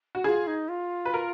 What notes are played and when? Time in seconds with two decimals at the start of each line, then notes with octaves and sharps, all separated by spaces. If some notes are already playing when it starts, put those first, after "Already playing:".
0.15 F#4
0.24 F4 G#4
0.47 D#4
0.69 F4
1.05 B4
1.14 A#4